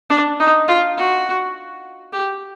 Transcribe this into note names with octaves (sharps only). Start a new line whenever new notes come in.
D4
D#4
F4
F#4
G4